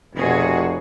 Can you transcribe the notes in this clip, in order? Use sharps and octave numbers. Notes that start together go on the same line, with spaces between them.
F1 B2 F#4 G#4